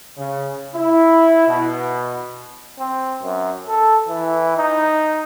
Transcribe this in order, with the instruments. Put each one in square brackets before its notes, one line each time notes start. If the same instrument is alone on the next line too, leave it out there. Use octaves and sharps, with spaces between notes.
[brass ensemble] C#3
E4
B2
[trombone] C4
F#2
A4
E3
D#4